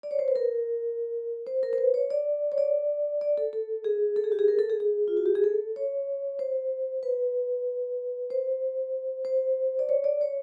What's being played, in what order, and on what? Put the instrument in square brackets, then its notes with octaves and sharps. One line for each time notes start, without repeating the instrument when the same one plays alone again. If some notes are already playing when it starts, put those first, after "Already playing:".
[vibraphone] D5
C#5
C5
B4
A#4
C5
A#4
C5
B4
C#5
D5
C#5
D5
D5
A4
A4
G#4
A4
G#4
G4
G#4
A#4
A4
G#4
G#4
F4
F#4
G4
G#4
A4
C#5
C5
B4
C5
C5
D5
C#5
D5
C#5